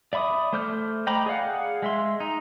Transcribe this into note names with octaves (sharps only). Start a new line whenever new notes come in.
D5 E5 B5 D6 D#6
A3 C5 D6 F6 G6
D#5 G5 A#5 B5 D6
G#4 D5 F5 F#5
G#3 E5 C6
D#4